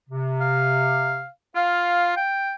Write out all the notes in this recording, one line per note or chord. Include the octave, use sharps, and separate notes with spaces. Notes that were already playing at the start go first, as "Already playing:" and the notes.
C3
F5
F4 F5
G5